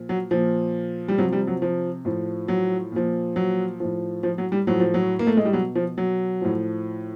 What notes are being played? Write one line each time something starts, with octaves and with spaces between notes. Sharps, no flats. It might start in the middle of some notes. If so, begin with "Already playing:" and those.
Already playing: A#2 F3
F#3
A#2 F3
G3
C3 F3 F#3
G3
F#3
F3
A2 F3
F#3
A#2 F3
F#3
A2 F3
F3
F#3
G3
A2 F3 F#3
F3
F#3
A#3
A3
G#3
G3
B2 F#3
F3
F#3
A2 F3